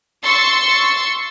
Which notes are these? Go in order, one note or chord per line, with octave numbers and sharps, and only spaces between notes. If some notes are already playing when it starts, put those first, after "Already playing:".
C6 C#6 E6 A6 C#7